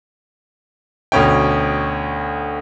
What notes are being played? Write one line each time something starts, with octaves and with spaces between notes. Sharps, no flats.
D2 B2 C#4 G5